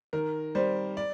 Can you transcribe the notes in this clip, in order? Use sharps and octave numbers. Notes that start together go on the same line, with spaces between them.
D#3 A#4
G3 C4 C5
D5